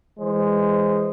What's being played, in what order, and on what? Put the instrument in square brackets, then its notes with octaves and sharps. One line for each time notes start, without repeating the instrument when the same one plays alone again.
[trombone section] E3 G#3 C5